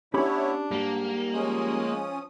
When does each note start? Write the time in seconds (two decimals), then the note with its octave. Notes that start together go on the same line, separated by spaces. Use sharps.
0.14 B3 C#4 D4 E4 G4 C#5 B5
0.71 G#2 G3 A#3
1.33 F3 G#3 C#4 D#6